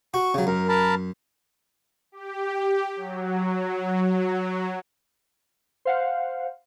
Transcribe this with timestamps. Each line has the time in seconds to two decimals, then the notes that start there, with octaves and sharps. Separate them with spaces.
0.14 F#4 C#6
0.34 C#3 F#3
0.47 F#2 A#4
0.69 A#4 A5 B5
2.12 G4
2.96 F#3
5.85 C5 F5 F#5